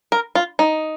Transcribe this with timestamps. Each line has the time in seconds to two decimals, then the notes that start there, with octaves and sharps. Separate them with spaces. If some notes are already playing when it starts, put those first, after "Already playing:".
0.12 A#4
0.35 F4
0.59 D#4